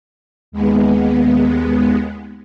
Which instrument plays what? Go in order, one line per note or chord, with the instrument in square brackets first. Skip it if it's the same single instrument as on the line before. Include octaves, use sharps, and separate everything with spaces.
[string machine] D#2 G#3 B3